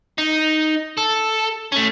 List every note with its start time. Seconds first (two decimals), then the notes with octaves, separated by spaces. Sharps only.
0.18 D#4
0.98 A4
1.72 A3 C#4